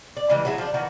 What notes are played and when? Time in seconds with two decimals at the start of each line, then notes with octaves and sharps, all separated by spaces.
0.17 D5
0.29 C#3 E3 G3 G#3
0.45 F#3 A3 E4 G#4
0.58 F3 D4
0.74 D#3 E3 F#4 A#4